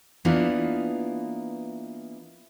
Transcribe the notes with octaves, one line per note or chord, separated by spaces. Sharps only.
E3 A#3 B3 D4 D#4 F4